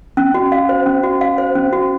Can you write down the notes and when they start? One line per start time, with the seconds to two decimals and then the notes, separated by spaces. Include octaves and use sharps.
0.17 C#4
0.34 F#4
0.52 F5
0.69 C5
0.86 C#4
1.03 F#4
1.21 F5
1.38 C5
1.55 C#4
1.73 F#4